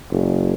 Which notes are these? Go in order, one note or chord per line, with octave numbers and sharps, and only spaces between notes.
F#1